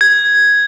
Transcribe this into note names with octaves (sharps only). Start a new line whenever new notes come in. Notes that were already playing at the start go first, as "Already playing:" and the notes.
G#6